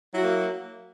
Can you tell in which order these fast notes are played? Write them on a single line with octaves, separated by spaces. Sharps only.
F#3 E4 F#4 A#3